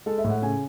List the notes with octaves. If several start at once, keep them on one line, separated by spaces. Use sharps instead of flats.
G#3 A4
E5
A2
F#5
C#3 G#5